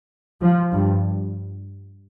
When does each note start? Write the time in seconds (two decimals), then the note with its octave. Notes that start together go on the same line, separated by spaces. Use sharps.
0.41 F3
0.72 G2